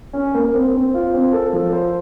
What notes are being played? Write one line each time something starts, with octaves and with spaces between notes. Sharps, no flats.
C#4
A#3
C4
C4
F4
C4
A4
F3
C5